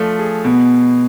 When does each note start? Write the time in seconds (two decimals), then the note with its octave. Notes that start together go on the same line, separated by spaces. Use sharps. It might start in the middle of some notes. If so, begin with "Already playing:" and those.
Already playing: F3 A3 D4
0.19 G#4
0.45 B2 B3